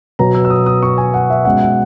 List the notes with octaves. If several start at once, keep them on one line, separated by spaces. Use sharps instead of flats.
B2 F#3 B3 A#5
E6
E6
D#6
D#6
C#6
G#5
F#5
E5
B2 G#3 C#4 F#5
F#5